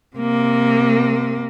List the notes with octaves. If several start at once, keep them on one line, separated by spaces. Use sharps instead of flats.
C3 A#3